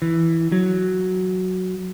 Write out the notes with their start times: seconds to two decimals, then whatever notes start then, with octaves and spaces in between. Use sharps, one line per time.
0.02 E3
0.52 F#3